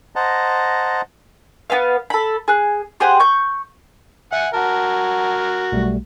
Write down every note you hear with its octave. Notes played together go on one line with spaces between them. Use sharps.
C5 D#5 F#5 A5 A#5
B3 C4 B4 F5
A4 B5
G#4 F#6
G4 G#4 C5 F#5
C#6 G6
E5 F#5 G#5
F#4 A#4 F#5 A5
B1 G3 A3